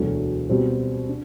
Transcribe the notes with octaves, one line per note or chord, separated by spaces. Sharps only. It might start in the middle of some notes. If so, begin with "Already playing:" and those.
Already playing: E1 D2 D3 F#3 A3
B2 G3 C4
D4